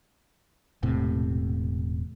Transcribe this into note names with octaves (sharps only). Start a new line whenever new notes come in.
E1 A2 C3